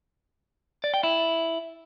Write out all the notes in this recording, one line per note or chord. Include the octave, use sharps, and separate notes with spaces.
D5
G5
E4